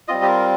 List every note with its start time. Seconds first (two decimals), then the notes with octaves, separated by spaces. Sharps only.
0.08 G3 C4 F4 D#5
0.22 G4
0.28 A#4